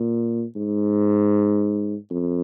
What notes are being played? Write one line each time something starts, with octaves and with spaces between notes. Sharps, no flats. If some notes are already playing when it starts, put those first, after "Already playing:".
Already playing: A#2
G#2
F2